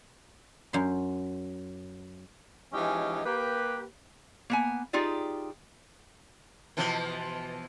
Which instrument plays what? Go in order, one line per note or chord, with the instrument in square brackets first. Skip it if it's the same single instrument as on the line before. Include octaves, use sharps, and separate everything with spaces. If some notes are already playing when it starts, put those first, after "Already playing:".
[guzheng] F#2 C6
[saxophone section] E3 F3 G#3 C#4 D#4 G4
A#3 G4 B4
[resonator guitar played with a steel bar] A#3 B3 G#5
D#4 F4 G4 G#4 D5
[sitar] B2 E3 F3